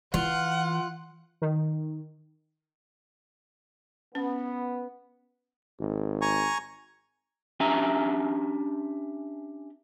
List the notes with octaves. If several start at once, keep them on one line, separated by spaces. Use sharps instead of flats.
E3 F4 F#5
D#3
B3 C#4
G#1
G#5 A#5 C#6
C#4 D4 G4 E5 G#5 A#5